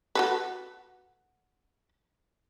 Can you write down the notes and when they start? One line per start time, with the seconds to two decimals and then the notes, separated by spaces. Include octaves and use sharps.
0.15 F#4 A4 B4